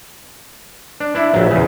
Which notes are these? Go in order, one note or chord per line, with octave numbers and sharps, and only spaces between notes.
D4
D4 E4 E5
A#1 F#3
E2 C#3